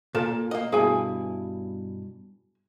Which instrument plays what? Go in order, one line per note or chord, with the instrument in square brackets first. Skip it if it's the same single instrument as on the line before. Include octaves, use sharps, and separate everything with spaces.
[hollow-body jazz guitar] A#2 [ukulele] A4 A#4 A5
[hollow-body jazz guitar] A#3 D#5
[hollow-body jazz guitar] G2 B2 E4 [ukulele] G#4 G#5